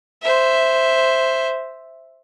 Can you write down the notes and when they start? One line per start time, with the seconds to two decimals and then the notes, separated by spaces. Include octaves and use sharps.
0.23 C5 E5